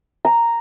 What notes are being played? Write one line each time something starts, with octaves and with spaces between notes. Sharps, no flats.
A#5